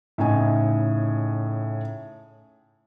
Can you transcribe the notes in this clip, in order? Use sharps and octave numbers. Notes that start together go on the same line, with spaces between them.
A2 C#3 D#4 D#5 G#5